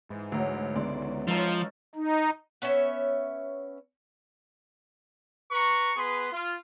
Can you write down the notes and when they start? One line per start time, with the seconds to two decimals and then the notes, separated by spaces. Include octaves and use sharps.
0.10 G#2 E3
0.32 D2 E3 F#3
0.75 C#2 G#2 D3 B3 D5 C6
1.28 F3 G#3 C#4 D#4 A4
1.95 D#4
2.62 B3 C#4 C#5 E5
5.51 B4 A#5 C#6
5.96 B3 G#4 B4 C6
6.32 F4